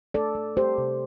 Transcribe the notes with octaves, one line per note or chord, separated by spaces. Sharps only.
A3 A4 D5
A3
A3 G4 C5
C3